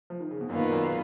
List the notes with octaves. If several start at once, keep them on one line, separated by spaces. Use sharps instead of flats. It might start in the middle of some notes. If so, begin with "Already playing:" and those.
F3
D#3
C#3
B2
F#2 A#2 D#3 A#3 F4 B4
G#2 B2
F#2 A#2